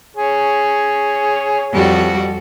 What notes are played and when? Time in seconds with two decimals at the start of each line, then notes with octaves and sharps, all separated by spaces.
0.17 G#4 C#5
1.73 F2 G3 F#4